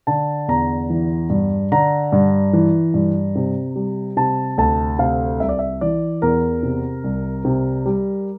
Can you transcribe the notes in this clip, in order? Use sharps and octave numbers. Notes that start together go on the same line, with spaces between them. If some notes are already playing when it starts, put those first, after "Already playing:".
D3 A5
E2 A#5
E3
G2
D3 A#5
G2
E3
G2
C3
G3
C3 A5
D2 A5
C3 F5
C2 E5
D5
E5
E3 D5
E2 A#4
C3
C2
C3
G3